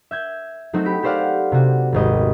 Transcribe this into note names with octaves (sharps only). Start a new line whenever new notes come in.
E5 G6 G#6
F#3 A3 C4 D#4 F#4
G4 B5 D7
G4 A4 C5 D5 F5 F#5
C3 F#4
D#1 G#1 D#5